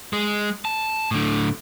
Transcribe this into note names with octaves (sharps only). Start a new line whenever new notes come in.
G#3
A5
A2 D3